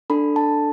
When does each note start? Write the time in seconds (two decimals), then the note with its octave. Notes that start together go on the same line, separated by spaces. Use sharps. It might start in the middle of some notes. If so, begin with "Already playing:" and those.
0.10 D4 A4 B5
0.36 A5